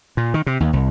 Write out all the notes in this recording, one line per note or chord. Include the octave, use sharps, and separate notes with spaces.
A#2
D#3
C3
D#2
C2